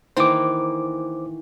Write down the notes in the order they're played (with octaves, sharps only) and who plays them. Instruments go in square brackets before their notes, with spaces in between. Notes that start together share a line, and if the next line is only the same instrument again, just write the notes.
[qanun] D#3 E3 A#3 [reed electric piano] C5 D6